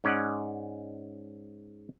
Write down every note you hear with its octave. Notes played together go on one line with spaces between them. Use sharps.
G#2 C#4 D5 D#5 F#5